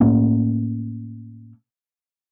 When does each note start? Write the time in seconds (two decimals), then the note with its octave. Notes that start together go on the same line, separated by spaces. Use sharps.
0.01 A2 A3 A#3 C#4